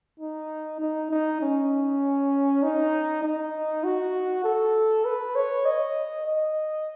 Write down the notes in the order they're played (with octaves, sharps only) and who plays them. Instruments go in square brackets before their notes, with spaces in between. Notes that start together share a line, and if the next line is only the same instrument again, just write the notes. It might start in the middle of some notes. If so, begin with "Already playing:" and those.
[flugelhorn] D#4
D#4
D#4
C#4
D#4
D#4
F#4
A4
B4
C#5
D#5
D#5